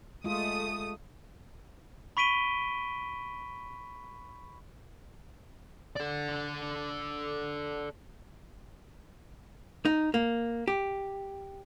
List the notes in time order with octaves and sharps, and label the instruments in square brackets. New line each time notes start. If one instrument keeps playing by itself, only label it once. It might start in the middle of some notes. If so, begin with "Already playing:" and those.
[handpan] G#3 F4 [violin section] A3 D#6
[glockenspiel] B5 C#6 B6 D7 D#7 G7
[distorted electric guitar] A4 D5
[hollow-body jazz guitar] D#4
A#3
G4